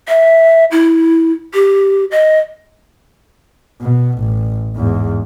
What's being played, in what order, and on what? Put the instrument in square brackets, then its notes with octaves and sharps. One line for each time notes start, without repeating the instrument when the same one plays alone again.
[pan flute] E5
E4
G4
D#5
[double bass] B2
A1
E2 G#2